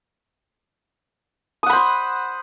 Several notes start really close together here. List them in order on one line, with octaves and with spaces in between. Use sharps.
D#6 F#5 B5 C5